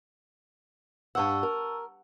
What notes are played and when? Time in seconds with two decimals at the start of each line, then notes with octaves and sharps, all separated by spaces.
1.15 G2 F#5 A5 C#6 E6
1.43 A#4